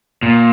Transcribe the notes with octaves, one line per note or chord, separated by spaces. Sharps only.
A#2